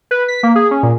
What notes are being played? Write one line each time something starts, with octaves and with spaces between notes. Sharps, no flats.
B4
B6
A#3
G#4
C#4
A#2